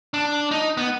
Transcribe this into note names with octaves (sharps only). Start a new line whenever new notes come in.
D4
D#4
B3